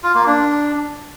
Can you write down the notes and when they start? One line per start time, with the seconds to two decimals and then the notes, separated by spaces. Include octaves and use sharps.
0.03 F4
0.15 A#3
0.26 D4